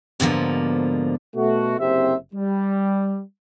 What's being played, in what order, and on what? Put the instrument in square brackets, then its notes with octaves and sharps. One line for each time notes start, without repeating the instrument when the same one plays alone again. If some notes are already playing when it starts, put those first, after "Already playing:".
[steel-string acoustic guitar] G#2 B2 D3 D#3 F3 A#3
[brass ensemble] B2 A3 F#4
F#1 C3 C4 G4 C5 E5
G3